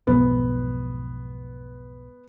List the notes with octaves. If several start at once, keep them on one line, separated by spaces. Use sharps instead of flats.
B1 F2 G#2 B3